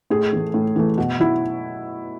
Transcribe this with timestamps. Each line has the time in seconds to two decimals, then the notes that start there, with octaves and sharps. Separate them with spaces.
0.10 A2 G#4
0.33 E3 A3
0.54 A2
0.76 E3 A3
0.98 B2 F#4
1.20 F#3 E4